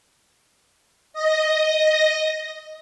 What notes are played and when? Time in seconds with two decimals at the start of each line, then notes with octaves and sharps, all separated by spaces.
1.13 D#5 A#6